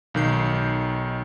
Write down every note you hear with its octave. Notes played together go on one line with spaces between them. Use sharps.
B1 D#3 G6 C7